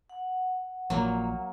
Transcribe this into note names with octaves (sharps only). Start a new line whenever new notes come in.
F#5
A#1 A#2 F#3 A#3